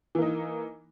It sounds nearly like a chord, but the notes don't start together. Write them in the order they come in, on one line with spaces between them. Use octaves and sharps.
E3 A#3 D#4